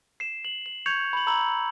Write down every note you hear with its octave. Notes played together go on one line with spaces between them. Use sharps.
C7 E7
F#7
F#7
C#6 G6 G#6 C#7 F7
B5 F#7
A#5 B5 E6 F#7